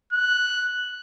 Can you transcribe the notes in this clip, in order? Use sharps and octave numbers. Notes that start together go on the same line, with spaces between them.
F#6